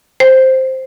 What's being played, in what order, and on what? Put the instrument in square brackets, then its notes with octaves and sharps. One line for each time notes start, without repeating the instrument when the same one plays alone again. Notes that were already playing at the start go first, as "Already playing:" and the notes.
[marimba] C5